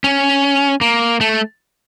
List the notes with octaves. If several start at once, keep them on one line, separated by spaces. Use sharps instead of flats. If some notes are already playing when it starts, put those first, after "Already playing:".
C#4
A#3
A3